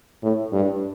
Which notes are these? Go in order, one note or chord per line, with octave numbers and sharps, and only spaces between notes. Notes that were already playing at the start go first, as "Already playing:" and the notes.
A2
G2